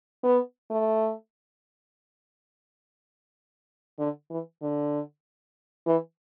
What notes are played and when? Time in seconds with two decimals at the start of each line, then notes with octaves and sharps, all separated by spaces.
0.23 B3
0.71 A3
3.99 D3
4.30 E3
4.62 D3
5.86 E3